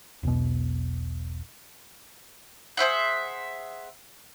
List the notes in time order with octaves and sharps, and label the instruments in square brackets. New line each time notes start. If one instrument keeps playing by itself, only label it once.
[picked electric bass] E1 B1 B2
[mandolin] G#4 C5 E5 F#5